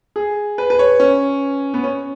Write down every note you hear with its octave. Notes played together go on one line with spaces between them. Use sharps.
G#4
B4
B4
C#5
C#4
B3
C#4